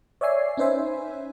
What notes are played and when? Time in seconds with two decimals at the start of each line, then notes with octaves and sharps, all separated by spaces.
0.21 C#5 D5 E5 G#5 C7
0.57 C#4 D#4 B4 C5 E5 G#5